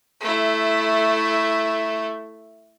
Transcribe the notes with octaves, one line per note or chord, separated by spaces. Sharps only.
A3 E4